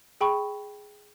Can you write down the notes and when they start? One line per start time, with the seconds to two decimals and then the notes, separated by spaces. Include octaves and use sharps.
0.21 G#4 G5 B5 C#6